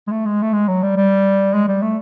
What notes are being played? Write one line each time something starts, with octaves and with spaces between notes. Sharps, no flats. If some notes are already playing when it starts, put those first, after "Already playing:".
G#3
A3
G#3
A3
G#3
F#3
G3
G3
G#3
G3
A3